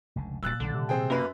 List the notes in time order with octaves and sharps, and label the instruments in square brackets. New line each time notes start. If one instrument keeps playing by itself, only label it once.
[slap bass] F1 C#2 D3
[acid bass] D1 [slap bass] A#2 G3 [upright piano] E6 F#6 A6
[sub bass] B1 [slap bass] A#2 D#3 G3 [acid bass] D3
[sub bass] C3
[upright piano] C4 G#4 G5
[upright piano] F#2 B4 [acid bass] A#3